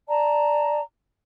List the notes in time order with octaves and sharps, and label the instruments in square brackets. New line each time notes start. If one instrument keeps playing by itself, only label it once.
[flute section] D5 A5 A#5